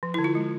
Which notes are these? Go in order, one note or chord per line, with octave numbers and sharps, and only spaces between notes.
F3
D3 E4
F4
G#3